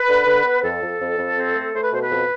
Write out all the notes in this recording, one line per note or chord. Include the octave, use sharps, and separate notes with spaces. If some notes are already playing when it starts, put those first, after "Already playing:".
Already playing: B4
D3
D3
B3
F2 A4
F2
F2
F2
C4
A3
A3 C5
B4
B2 C5
B4
F2